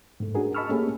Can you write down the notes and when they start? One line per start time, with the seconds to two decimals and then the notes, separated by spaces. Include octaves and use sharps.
0.20 G#2 A3
0.35 C#4 D4 F#4 G#4 A#4
0.55 D#5 A5 B5 C#6 E6 F6
0.69 A3 A#3 C#4 G4 G#4